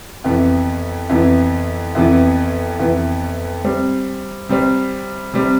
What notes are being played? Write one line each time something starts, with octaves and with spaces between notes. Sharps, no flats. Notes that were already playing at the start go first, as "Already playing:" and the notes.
F2 C3 E3 B3
F2 C3 E3 B3
F2 C3 E3 B3
F2 C3 E3 B3
C3 G3 C4
C3 G3 C4
C3 G3 C4